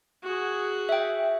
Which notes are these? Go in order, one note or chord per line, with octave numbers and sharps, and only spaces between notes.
F#4 G#4
E5 G5